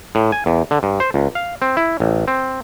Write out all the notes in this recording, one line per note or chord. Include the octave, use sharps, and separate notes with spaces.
A2
G#5
E2
D3
G2
C5
C#2
F5
C4
E4
A1
C4